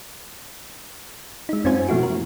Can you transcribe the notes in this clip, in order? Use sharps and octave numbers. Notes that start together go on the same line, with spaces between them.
G#3 D#4
F#2 C4 C#4 F4 C5 G#5
B2 F3 A3 E4 F#4
A#4